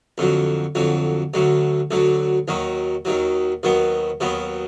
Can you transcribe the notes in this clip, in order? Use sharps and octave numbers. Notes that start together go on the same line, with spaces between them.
F2 D3 F#3
F2 D3 F#3
D2 D3 F#3
D2 D3 F#3
D#2 D#3 F#3
D#2 D#3 F#3
D#2 D#3 F#3 B3
D#2 D#3 F#3 B3